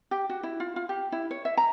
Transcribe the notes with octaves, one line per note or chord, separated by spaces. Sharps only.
G4
F#4
E4
F4
F4
G4
E4
C#5
E5
A#5